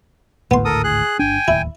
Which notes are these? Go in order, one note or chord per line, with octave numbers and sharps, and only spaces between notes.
G#1 D2 A2 B3 C6
A4 A#4 D#6
G#4 F#6
G1 D4 G5 G#5
D1 D#2 E4